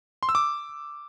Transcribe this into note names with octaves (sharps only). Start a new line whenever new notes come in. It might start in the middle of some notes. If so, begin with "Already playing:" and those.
C6
E6
D6